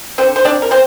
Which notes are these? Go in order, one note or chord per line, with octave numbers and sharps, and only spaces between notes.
D3 C4 C5
C5
C4 D4 D5
A#4
C4 C5